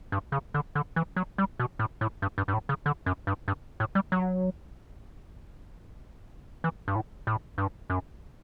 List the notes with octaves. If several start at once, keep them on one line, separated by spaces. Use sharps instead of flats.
G2
C#3
D3
D3
E3
F#3
G3
B2
A2
A2
G2
G2
G2
A2
C#3
D3
F#2
G2
G2
A2
G3
F#3
E3
G2
A2
A2
G2
F#2